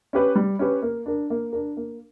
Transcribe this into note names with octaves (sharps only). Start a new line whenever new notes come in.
C#4 G4 B4
G3
C#4 G4 B4
A#3
D4 A#4
A#3
D4 A#4
A#3